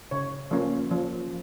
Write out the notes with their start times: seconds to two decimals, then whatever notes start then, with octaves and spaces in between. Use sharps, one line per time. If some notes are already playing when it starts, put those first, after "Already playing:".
0.11 C#3 C#5
0.51 F3 A#3 C#4
0.91 F3